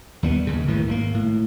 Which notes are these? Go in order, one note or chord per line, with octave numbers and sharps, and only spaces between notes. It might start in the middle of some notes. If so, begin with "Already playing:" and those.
D#2 G3 B3
D#2 C#3
C2 A2 D#3 E3
G#1 C3 A#3
A2